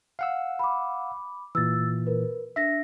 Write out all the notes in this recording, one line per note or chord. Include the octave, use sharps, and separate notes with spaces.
F5 F#5 E6
B5 D6
A#2 E3 E6 A6
A#4 B4
D4 E5 A#6